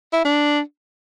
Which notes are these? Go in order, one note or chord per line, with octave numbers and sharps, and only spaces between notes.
E4
D4